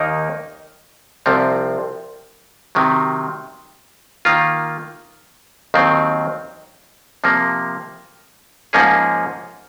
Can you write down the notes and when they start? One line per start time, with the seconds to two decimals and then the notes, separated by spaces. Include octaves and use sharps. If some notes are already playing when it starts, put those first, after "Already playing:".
Already playing: D#2 D#3 A#3 D#4 A#4
1.26 C2 C3 F3 C4
2.75 C3 D#3 F#3
4.25 D#3 A#3 F4
5.74 D#2 D#3 F#3 C4
7.24 C3 F3 A#3
8.73 G#2 F3 A#3 C#4 G#4